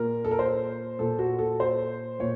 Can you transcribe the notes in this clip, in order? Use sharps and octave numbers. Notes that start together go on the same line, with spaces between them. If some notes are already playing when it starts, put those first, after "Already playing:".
Already playing: A#2 A#4
A4
A#4
C5
A#2 A4
F#4
A4
C5
A#2 C#5